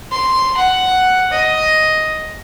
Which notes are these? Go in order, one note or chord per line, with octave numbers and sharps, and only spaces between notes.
C6
F#5
D#5